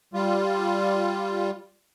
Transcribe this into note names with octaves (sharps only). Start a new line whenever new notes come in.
G3 F4